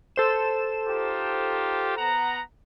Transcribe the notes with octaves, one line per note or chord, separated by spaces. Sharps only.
A4 C5 E7
D#4 F4 G4
B3 F#5 A#5